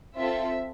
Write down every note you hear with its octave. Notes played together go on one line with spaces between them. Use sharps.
C4 F4 A4 E5